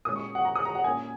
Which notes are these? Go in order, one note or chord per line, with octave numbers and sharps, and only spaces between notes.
A#2 G#3 C#4 D#6
C#6
F#5
A#5
D#6
A#5
F#5
A#2 A#3 C#4 G#5